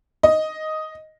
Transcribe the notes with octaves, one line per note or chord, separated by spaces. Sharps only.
D#5